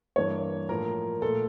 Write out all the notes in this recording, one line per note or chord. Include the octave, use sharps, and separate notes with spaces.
G2 E3 A#3 C#5
A2 F3 A#3 A#4
A#2 A3 A4